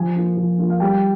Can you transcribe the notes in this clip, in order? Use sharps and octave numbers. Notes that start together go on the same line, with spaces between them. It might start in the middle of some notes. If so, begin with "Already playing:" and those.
Already playing: F3 G#5
A#3 F4
F3
A#3 F4
F5
G3 G5